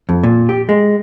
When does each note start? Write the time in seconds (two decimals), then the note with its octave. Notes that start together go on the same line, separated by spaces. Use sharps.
0.09 F2
0.24 A#2
0.49 G4
0.69 G#3